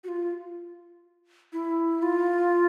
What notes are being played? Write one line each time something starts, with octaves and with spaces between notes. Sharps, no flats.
F#4
F4
E4
F4